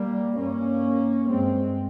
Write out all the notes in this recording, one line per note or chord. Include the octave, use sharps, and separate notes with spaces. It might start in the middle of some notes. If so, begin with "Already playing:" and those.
Already playing: G3 A#3
G2 A#3 C#4
G2 G#3 C4